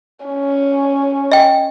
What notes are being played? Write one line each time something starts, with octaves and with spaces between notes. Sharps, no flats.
C#4
D#5 G5